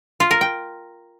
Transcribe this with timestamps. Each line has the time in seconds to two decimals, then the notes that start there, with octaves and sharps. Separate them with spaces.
0.20 F4
0.31 A#4
0.41 G5